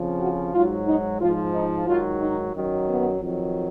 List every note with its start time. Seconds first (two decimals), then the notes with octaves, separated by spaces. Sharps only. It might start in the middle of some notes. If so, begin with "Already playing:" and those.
Already playing: F2 C#3 F3
0.21 F#4
0.54 G#2 F#3 F4
0.87 D#4
1.20 G#2 F3 F4
1.54 D#4
1.87 G#2 D#3 F#3 F4
2.20 D#4
2.55 F#2 D#3 F#3
2.87 B3
3.20 F2 D#3 F#3